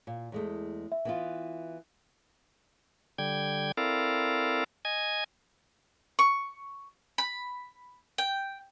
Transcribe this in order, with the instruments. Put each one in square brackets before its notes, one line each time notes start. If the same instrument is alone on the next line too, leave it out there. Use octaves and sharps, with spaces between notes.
[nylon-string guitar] A#2
E2 G#3 A3
[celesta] E5
[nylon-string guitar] E3 B3 F4
[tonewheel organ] D3 G3 G5 G#6
C4 E4 A4 A#4 D5 F5
D#5 G#5 G#6
[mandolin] C#6
B5
G5